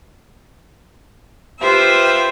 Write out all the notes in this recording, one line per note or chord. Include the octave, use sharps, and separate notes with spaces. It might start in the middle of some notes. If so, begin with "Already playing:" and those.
F4 G4 B4 C5 E5